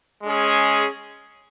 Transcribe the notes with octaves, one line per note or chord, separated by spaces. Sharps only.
G#3 C#4 G#4